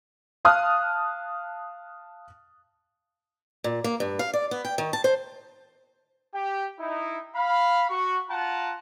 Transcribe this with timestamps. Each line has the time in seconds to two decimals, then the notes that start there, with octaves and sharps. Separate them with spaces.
0.45 F5 A5 D#6 F6 F#6
3.64 A#2
3.84 A#3
4.00 G2
4.19 F5
4.34 D5
4.51 B3
4.65 G5
4.78 D#3
4.93 A5
5.04 C5
6.35 G4 G5
6.80 D#4 E4
7.36 F5 B5
7.89 F#4 C#6
8.30 F4 F#5 A5 A#5